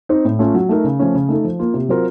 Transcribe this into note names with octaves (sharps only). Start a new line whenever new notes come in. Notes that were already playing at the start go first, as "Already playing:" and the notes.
C4 D#4
A2
A3 C#4 F4
F#3
A3 D#4 A#4
C#3
F3 A3 C#4
C#3
A3 D#4 A4
F3
A#3 F4
C3
F#3 C4 F4 A#4